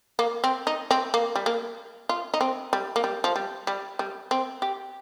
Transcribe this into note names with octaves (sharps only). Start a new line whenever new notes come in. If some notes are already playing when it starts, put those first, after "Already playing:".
A#3
C4
D#4
C4
A#3
G3
A#3
F4
D#4
C4
G3
A#3
G3
F3
G3
G3
G3
C4
G4